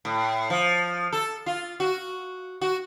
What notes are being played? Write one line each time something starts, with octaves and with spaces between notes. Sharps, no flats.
A2
F3
A4
F4
F#4
F#4